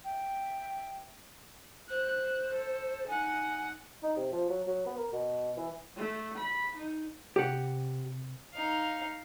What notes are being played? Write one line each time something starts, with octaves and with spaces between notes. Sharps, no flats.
E5 G5
C5 F#6
A4
D#4 F#5 G#5
D#4
C3
F3
F#3
F#3
B3
A#4
B2
E3
A3
B5
D#4
C3 G4 F#5
D#4 F5